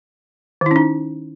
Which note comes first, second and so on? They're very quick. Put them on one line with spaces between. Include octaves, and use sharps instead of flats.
D#3 E4 C#4 D#4